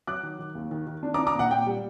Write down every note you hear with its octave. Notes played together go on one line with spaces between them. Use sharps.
F#3 D6 F#6
D#3
D#3
D#2
D#3
D#3
D4
A#5 D6
D4
A#5 D6
A#2 F#5
A#2 G5
G3